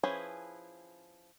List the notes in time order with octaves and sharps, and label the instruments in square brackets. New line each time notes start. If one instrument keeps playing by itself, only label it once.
[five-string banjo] F3 C#4 E4 G#4 B4